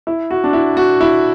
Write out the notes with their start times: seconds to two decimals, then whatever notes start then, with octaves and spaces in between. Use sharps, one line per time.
0.07 E4
0.31 F#4
0.44 D4
0.53 E4
0.77 F#4
1.01 E4